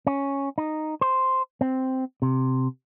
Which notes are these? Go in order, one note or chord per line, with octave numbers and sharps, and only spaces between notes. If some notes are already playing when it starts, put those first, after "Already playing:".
C#4
D#4
C5
C4
C3